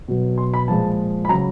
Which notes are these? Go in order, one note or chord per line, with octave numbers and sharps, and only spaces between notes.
B2 F#3
C6
B5
A#2 F3 G#3 A5
B5
C#3 F#3 A#5